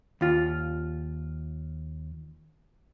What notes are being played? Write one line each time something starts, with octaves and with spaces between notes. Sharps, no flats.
D#2 F4